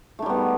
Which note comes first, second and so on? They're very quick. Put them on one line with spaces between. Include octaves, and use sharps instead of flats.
A3 D#3 G3 B3